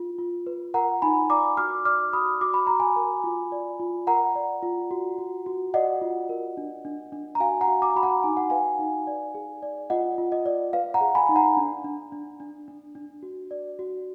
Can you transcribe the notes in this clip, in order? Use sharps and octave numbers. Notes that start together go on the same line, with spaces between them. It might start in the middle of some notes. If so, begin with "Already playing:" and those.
Already playing: F4
F4
B4
A#4 F#5 A#5
D#4 G#5 B5
D5 A#5 D6
F#4 D6 F6
D5 D6 F6
F#4 B5 D#6
F#4 D6
B5
F#4 A#5
G#5 B5
A#4
F4
D5
F4
A#4 F#5 A#5
D5
F4
F#4
F#4
F#4
D5 D#5 F#5
F4
A#4
D4
D4
D4
A#5
F#4 F5 G#5
F#5 A#5
F#4
A#5 D6
F#4 B5
F#5 A#5
D#4 G#5
F#5
B4 F5 G#5
D#4
D5
G#4
D5
F4 D#5 F#5
F4
D#5
D5
B4 F5
F#5 A#5
G#4
G#5 B5
D#4
F#5 A#5
D4
D4
D4
D4
D4
D4
F#4
D5
F#4